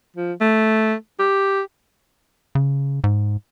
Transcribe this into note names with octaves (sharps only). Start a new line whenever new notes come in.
F3
A3
G4
C#3
G#2